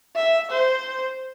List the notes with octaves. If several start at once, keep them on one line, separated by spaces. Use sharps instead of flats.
E5
C5